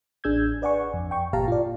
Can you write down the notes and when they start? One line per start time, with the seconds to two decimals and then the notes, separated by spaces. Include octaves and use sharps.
0.24 A1 D4 G#4 E6 G6 G#6
0.62 B4 D5 F#5 G#5 C#6
0.94 F2
1.11 G5 C#6
1.33 G1 A#2 G4 F5 A5 A#5
1.48 F4 D5